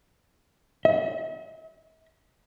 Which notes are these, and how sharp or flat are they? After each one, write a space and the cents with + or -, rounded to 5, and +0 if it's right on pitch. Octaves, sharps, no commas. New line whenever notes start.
E5 -45